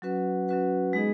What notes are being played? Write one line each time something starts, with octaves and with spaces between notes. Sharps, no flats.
F#3 C#4 F#4 B4 F#5
F#3 C#4 F#4 B4 F#5
G#3 B3 D#4 G#4 D#5